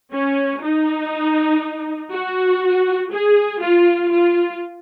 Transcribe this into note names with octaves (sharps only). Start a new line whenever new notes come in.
C#4
D#4
F#4
G#4
F4
F4